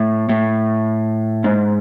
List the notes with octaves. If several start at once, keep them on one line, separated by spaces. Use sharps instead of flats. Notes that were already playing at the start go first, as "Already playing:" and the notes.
Already playing: A2
A2
G#2